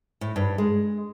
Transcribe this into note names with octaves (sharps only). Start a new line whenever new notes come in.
A2
G2
G#3